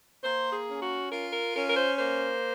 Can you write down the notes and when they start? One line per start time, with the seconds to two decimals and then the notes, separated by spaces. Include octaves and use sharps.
0.24 A#3 C5
0.53 G#4
0.67 C#4
0.82 F#4
1.11 F4 A#4
1.33 A#4
1.55 C#4 A#4
1.69 A#4
1.77 C5
1.99 A#3 C5